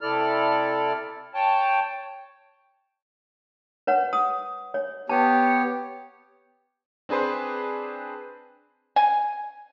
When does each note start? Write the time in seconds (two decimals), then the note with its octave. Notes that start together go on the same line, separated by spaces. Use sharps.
0.01 C3 E4 A4 D5 F6
1.34 C#5 G5 A5
3.87 B4 C#5 F#5
4.13 D#6
4.74 C#5
5.09 B3 G4 C#5 A5
7.09 C4 D4 G#4 B4 C5
8.96 G#5